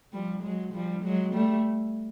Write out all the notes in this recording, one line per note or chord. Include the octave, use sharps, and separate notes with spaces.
F3 G3
F#3 G#3
F3 G3
F#3 G#3
G3 A3